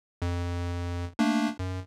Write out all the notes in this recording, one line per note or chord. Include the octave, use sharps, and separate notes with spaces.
F2
A3 A#3 D4
F#2